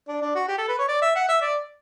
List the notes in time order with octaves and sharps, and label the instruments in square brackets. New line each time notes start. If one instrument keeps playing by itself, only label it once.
[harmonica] D4
D4
F#4
G4
A4
B4
C#5
D5
E5
F#5
E5
D5